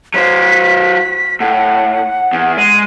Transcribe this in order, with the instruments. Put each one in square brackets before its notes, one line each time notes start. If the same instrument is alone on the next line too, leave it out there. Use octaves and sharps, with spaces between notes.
[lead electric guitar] F#3 C5 [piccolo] B6
[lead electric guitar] A2 [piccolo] F#5
[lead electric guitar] E2
[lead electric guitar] G#3 [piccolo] D#7